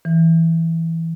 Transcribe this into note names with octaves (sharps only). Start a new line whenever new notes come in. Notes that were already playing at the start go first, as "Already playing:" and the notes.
E3